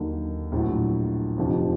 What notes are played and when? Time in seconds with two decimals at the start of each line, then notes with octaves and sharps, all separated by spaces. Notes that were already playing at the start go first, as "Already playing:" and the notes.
Already playing: D#2 D3 F#3
0.52 A#1 A2 F#3
1.38 F1 F2 D3 F3